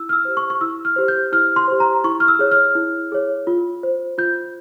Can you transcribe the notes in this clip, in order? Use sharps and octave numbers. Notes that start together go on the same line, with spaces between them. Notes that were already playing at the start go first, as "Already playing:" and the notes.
Already playing: E4 E6
F6
E6
G4 C5
C#6
C#6
E4 E6
F6
G4 C5
G6
E4 F6
C6
G4 C5
A#5
E4 C#6
F6
E6
G#4 C#5
F6
E4
G#4 C#5
F4
C5
F4 G6